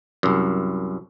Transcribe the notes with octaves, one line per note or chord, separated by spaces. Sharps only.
C2 F#2